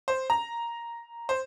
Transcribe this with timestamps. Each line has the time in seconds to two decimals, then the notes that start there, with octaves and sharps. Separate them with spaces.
0.08 C5
0.30 A#5
1.29 C5